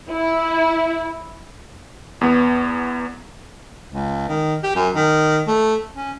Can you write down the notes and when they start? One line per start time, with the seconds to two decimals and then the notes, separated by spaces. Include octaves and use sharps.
0.11 E4
2.21 E2 B3
3.90 C#2
4.29 D#3
4.64 G4
4.75 F#2
4.95 D#3
5.47 A3
5.94 C#4